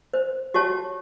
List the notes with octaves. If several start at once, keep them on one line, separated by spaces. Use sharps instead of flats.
C5
F#4 G4 C#5 A5